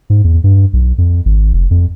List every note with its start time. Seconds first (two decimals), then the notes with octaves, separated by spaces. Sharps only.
0.10 G#2
0.24 E2
0.44 G2
0.73 B1
0.98 F2
1.25 G#1
1.53 F1
1.71 F2